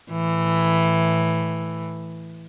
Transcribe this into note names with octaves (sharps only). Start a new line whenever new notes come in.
A2 E3